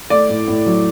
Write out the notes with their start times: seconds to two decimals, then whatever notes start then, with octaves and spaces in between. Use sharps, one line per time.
0.10 A3 D5
0.29 A2
0.48 A2
0.66 F#3